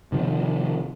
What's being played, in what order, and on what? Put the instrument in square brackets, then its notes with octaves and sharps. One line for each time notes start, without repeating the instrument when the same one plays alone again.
[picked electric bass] C3 D#3 F3